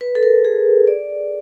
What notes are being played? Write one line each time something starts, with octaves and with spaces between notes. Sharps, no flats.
B4
A4
A#4
G#4
D5